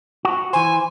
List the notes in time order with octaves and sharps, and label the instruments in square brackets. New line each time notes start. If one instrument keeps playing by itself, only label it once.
[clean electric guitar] F#4
[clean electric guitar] E3 C5 [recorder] G#5